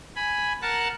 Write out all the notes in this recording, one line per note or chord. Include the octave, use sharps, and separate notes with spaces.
G#5 B5
A#4 F#5 A5 F#6